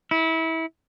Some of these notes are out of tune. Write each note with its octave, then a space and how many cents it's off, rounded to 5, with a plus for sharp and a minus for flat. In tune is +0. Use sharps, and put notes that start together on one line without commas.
E4 -25